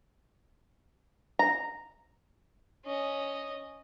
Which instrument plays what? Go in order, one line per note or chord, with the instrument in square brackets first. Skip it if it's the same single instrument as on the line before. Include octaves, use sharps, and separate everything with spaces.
[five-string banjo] A#5
[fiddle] C#4 D#5